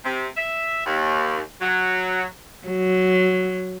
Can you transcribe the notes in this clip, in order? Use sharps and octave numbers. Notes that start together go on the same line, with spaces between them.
C3
E5
D#2
F#3
F#3